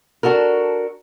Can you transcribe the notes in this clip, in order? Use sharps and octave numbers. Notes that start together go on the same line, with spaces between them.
D4 F#4 A4 A#4